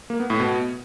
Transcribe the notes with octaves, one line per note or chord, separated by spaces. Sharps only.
A#3
B3
A2
B2